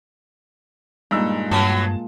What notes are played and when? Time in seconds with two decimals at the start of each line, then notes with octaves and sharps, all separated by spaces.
1.11 G2 A#2 G#3 D#4 E6
1.51 G2 B2 F#3 C#4 A5 D#6